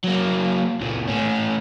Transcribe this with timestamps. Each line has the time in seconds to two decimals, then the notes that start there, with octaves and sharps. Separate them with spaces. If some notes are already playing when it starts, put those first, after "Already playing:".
0.04 F#3 A#3
0.81 C#2 A#2
1.08 A2 C#4